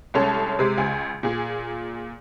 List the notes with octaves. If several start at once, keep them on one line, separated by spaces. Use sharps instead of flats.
C2 G#3 C#4 A4
C3 G#3
C#2 G#5
A#2 G#4